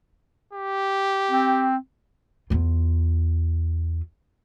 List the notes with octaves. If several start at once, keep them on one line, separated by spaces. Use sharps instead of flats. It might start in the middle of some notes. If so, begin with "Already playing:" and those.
G4
C4
E2 F4